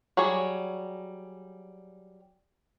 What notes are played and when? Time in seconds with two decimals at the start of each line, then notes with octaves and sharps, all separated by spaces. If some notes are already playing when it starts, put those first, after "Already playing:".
0.17 F#3 G3 G#4 C#5